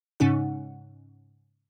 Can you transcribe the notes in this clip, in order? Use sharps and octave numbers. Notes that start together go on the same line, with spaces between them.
G#2 C#3 C#4 D#4 F#5